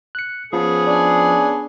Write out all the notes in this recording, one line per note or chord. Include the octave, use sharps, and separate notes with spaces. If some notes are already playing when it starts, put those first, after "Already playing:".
F#6 C#7
F3 B3 C#4 G#4
D4 G#5